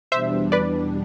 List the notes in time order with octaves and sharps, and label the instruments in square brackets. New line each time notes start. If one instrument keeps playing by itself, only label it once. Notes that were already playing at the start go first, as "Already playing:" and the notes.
[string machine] E2 B2 G3 D4 [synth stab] C5 E5
[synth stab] B4 D5